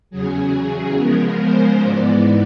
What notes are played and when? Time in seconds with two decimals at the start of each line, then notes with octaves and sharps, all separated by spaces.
0.11 E2 C#3 F#3 G#4
0.97 C#3 F3 G#3 B3 A#4
1.40 C5
1.83 G#2 E3 G#3 B3 D5